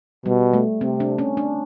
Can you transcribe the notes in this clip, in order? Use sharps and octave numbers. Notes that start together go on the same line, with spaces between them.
B2 G3
A3
C3 C4
D4
C#4
D4